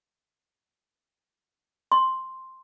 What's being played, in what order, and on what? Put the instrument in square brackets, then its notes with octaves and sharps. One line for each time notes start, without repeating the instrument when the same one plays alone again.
[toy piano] C6